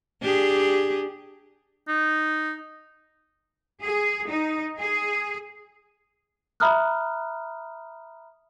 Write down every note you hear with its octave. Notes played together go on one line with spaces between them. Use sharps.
D4 G4 G#4
D#4
G#4
D#4
G#4
E5 A#5 B5 D#6 F6 F#6